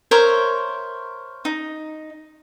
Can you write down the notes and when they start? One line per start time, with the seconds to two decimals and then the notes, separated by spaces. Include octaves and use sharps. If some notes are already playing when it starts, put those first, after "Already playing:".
0.11 A#4 C5 C#5 E5
1.45 D#4